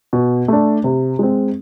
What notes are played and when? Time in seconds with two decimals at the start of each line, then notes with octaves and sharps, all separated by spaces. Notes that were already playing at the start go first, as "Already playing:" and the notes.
0.13 B2
0.48 A3 D4
0.84 C3
1.19 G#3 C4